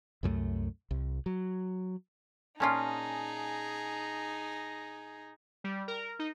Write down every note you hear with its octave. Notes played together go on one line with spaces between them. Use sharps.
C2 F#2 F3 A3
C2
F#3
A#2 C#4 D#4 F4 G#4 G#5 A5 D#6
G3
A#4
D#4